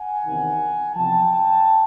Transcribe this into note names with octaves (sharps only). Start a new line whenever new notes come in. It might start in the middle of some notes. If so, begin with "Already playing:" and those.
Already playing: F#5 G#5
E2 C3 D#3
E2 C3 F3 G5 A5